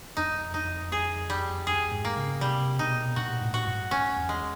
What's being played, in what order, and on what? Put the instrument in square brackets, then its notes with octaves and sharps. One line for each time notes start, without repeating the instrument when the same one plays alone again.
[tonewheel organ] F2 [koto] D#4
[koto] D#4
G#4
G3
G#4
[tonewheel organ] G#2
[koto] A#3
[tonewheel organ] C#3
[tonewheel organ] C3 [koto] G3
[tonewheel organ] B2 [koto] D#4
[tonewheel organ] A#2 [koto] F#4
[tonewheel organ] A2
[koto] F#4
[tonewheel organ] G2
[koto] C#4
[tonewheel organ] E2
[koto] G#3